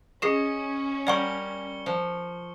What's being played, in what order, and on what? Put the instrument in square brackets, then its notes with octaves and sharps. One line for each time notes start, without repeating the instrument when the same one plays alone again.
[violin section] C#4 [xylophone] G#4 C7 E7 [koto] D#5 [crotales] C#6 C#7
[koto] G3 A#4 [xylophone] D5 F#5 C#6 [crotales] C#7 G7
[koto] F3